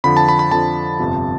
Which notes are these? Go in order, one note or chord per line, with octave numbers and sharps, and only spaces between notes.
F2 D3 F3 B5
A5
B5
B5
F2 D3 F3 A5
G1 F2 C3 F3